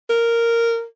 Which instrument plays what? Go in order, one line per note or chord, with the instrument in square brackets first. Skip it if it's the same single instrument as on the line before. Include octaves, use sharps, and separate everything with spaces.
[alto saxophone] A#4